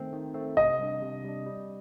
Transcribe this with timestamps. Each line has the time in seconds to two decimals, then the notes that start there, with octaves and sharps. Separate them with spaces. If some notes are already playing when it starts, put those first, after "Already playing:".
Already playing: D#3 A3 C4
0.12 D#3
0.34 A3 C4
0.57 C3 D#5
0.79 G3 D4
1.02 C3
1.24 G3 D4
1.46 G3